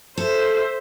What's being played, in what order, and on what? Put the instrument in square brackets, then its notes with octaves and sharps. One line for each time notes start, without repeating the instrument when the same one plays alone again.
[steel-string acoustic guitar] A4 [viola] C5 E5